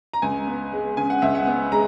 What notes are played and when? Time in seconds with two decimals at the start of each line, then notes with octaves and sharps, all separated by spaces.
0.13 A#5
0.22 C#2 G#5
0.47 B3
0.72 G#3
0.97 C#3 G#5
1.10 F#5
1.22 C#2 E5
1.35 F#5
1.47 B3
1.72 G#3 A#5